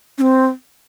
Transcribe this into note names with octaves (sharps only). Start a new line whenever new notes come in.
C#4
C4